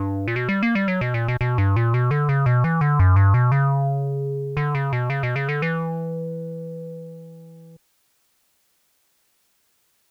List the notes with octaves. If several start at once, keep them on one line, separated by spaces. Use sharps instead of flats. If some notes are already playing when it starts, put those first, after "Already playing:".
Already playing: G2
A#2
B2
G3
A#3
G3
F#3
B2
A#2
B2
B2
G2
A#2
B2
D3
C#3
B2
E3
D3
F#2
G2
B2
C#3
D3
C#3
B2
C#3
B2
C#3
D3
E3